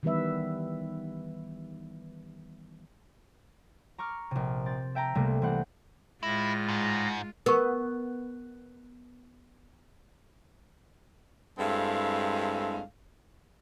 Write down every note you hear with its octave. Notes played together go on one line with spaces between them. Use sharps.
D#3 E3 G3 B3 B4 E5
A#5 C#6 D6 F6
A#1 C3
C4 A6
E5 G5 A5 A#5
C2 C3 A3 A#3
C2 E3 C4 F#5
A2 G#3 E4 F4 A#6
G#2
B3 A#4 C#6
G2 G#3 C4 E4 A4 F5